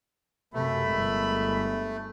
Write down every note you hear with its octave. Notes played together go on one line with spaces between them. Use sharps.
F#2 C3 A3 A#4 E5 B5
G1 G#3